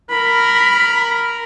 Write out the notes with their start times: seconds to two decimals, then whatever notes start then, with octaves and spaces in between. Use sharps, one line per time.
0.11 A#4 B5